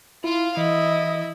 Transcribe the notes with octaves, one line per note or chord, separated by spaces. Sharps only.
E4 F4 F5
E3 E4 D#5